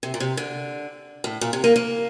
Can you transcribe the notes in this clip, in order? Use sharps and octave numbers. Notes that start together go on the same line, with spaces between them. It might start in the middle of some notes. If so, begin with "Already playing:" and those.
C3
A#2
C3
D3
A2
A#2
C3
A#3
A#3